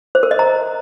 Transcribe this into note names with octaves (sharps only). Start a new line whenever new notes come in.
C5
A#4
D#5
A#5